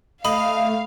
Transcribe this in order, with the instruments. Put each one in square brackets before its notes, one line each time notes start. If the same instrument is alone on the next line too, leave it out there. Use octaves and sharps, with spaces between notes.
[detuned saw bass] A3 [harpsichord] D#5 [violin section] F5 [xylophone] B5